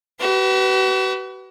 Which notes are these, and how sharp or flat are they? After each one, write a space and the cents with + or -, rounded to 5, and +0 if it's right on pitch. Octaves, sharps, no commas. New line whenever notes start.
F#4 +45 B4 +0